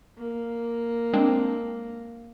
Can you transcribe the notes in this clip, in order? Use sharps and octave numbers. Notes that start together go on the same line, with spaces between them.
A#3
G#3 C4 D4